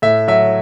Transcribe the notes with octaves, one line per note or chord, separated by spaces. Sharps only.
A2 E5
F#3 E5